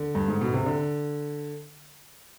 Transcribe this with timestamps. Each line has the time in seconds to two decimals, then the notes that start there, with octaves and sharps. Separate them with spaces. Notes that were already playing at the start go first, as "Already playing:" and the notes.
Already playing: D3
0.15 G2
0.28 G#2
0.41 B2
0.54 C3
0.66 D3